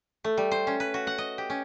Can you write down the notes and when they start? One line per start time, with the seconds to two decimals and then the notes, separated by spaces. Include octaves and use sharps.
0.24 A3
0.37 G3
0.52 C5
0.67 C#4
0.80 B4
0.94 F#4
1.07 F#5
1.18 D#5
1.38 G4
1.50 C#4